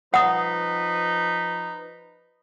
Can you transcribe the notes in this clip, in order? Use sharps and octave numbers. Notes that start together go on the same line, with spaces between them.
F3 D#4 B4 F#5 D#6